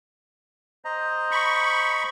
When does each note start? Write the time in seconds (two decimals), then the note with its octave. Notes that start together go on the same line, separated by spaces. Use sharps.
0.85 C5 D#5 A#5
1.31 B5 C#6